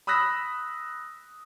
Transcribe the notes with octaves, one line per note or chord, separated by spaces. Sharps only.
B5 D#6 E6 F#6 A#6 B6